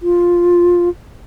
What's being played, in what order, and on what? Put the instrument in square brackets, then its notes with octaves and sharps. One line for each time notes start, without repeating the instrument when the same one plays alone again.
[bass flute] F4